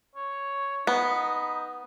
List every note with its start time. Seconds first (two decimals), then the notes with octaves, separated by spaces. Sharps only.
0.16 C#5
0.87 B3 D#4